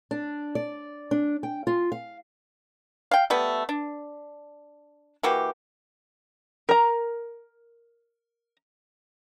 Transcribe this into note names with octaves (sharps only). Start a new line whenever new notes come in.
D4
D5
D4
G5
F4
F5
F5 G5
G3 A3 B3
D4
E3 A#3 F#4 G4
A#4 A#5